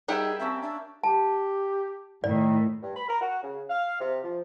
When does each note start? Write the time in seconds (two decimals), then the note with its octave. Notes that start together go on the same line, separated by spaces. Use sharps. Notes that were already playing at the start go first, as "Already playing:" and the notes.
0.08 G3 D#4 G#4 A#4 E5 F#5 G5 E6
0.40 A#3 C4 C#4 E5 A5
0.62 D4 E5
1.04 G4 A5
2.24 A2 D#3 D5
2.83 G2
2.95 B5
3.08 A#4
3.22 F#4
3.42 C#3
3.69 F5
4.00 C3
4.23 F3